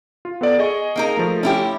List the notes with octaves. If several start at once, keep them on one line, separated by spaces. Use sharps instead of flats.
F4
B3 A4 D5
G#4 D#5 C#6
A#3 D#4 A#4
F3 A3
C#4 E4 G4